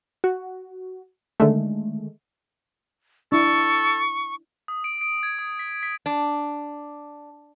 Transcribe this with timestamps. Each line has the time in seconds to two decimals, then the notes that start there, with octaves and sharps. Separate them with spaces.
0.24 F#4
1.40 D3 D#3 G#3 A3
3.32 D4 E4 A4 C#6
4.68 D#6
4.84 D7
5.01 D7
5.23 G#6
5.39 D#6
5.59 B6
5.83 B6
6.06 D4